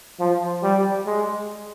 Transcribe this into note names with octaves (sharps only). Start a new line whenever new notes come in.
F3
G3
G#3